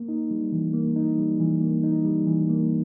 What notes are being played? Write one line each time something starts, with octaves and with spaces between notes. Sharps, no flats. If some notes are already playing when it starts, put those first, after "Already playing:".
Already playing: A#3
D#4
G3
E3
A#3
D#4
G3
E3
A#3
D#4
G3
E3
A#3